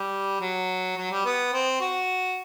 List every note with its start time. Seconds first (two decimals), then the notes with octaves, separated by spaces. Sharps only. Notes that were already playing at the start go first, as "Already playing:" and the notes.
Already playing: G3
0.40 F#3
0.97 F#3
1.11 G3
1.25 B3
1.53 C4
1.80 F#4